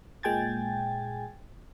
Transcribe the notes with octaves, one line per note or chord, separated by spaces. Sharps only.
A#2 G#3 G5 G#5 G#6 A6